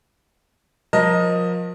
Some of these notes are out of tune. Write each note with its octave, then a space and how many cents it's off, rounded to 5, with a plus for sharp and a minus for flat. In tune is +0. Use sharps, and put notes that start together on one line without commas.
F3 +35 A#4 +25 D#5 +0